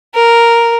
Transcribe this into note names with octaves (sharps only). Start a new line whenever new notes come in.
A#4